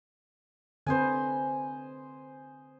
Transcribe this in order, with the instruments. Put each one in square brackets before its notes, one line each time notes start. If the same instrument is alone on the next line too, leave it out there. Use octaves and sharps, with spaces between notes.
[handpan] D3 C4 B4 [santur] C5 D#5 G#5